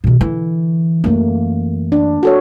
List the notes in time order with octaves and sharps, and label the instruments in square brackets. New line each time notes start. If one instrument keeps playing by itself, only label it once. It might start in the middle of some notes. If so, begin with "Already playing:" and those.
[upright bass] B2 D#3
D3 E3
[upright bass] F#2 E3 [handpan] A3 A#3
[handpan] D4
F#4 A4 C#5